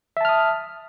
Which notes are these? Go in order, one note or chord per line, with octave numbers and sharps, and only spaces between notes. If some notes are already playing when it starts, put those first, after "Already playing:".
E5 A5 D#6 F6